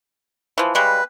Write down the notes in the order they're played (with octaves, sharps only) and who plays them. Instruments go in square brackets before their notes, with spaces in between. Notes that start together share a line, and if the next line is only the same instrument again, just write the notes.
[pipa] E3 F3
[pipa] C#3 G3 G#3 [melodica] B4